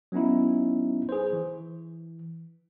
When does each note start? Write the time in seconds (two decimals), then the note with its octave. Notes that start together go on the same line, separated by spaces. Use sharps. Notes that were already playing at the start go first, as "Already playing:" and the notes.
0.12 F#3 B3 C#4 D#4 E4
1.09 G#4 B4 C5
1.33 E3